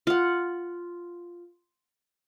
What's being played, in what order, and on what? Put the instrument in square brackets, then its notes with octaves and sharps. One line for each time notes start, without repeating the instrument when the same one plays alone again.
[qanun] F4 F#5